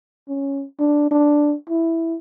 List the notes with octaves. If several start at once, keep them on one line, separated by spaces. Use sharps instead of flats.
C#4
D4
D4
E4